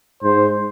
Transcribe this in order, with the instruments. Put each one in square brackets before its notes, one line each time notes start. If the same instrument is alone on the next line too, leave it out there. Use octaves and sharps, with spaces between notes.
[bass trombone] G#2 [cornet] C5